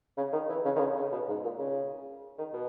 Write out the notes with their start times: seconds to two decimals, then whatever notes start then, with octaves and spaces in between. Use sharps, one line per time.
0.17 C#3
0.33 D#3
0.49 E3
0.65 C#3
0.76 D#3
0.80 C#3
0.97 C#3
1.12 B2
1.28 G#2
1.44 A#2
1.59 C#3
2.38 D#3
2.53 B2